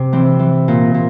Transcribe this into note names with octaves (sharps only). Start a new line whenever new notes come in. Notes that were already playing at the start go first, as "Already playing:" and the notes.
Already playing: C3
E3 C4
E3
A#2
A#2